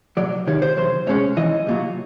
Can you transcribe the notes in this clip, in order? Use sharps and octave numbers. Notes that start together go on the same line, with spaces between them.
C2 A#2 F#3 D5
C3 D#3 G3 C#5
C5
E2 C3 F#3 C5
C2 B2 G#3 C#4 C#5
B1 A2 E3 D#5
C2 A#2 F#3